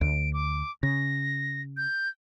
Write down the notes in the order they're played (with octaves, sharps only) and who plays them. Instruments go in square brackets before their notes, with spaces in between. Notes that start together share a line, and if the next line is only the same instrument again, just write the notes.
[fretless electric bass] D2 [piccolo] D7
[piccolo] D6
[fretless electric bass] C#3 [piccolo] A#6
[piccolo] G6